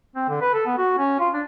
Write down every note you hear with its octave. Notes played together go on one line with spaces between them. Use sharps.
C4
D3
B4
A4
B3
F#4
C#4
F4
D4